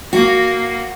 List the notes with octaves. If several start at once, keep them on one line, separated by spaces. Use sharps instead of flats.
A#3 F#4